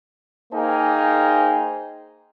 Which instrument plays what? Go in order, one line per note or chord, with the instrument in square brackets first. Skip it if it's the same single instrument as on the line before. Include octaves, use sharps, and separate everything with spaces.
[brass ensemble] A#3 D#4 G#4 C5 G5 G#5